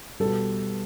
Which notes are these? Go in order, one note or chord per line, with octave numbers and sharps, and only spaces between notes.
B2 G3 A4